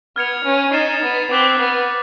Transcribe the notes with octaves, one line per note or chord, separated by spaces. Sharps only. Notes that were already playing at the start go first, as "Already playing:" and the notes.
B3 F6 G#6 C#7 F7
C#4
D#4 F6 A6 C7 E7
B3
C4 D6 F#6 B6 E7
B3